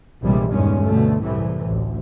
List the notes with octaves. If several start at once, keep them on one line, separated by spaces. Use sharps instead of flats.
A#1 E2 C3 E3 G3 G#3
E2 G2 A#2 D#3 G#3 C#4
D2 B2 D3 A3
C2 F#2 A2 C3 E3
A1 D2